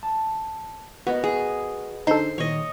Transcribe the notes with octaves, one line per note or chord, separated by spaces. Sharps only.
A5
B3 F#4 A#4 D#5
G#4
D3 D#4 A4 C5 C6
A#2 D#3 C#5 D#5